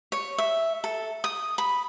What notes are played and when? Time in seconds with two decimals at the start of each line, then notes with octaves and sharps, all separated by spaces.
0.12 C#5
0.38 E5
0.84 A4
1.24 D#6
1.58 B5